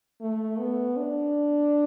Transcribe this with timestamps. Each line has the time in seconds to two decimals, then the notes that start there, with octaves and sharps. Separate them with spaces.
0.21 A3
0.59 B3
0.97 D4